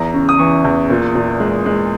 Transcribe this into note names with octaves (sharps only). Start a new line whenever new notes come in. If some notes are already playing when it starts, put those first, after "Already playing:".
Already playing: E2 A#5
C#3
D#6
E3 C#6
E2
A#2
A#2
G#3
G#3